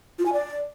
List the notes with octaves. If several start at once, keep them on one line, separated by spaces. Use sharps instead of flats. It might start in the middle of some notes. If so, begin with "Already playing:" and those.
F4
G#5
D5